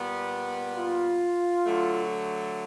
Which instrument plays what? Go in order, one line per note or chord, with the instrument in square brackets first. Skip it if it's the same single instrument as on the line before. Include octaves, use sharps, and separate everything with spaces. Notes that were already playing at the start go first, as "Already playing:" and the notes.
Already playing: [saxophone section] A#2 G3 B3
[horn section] F4
[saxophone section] D3 F#3 A3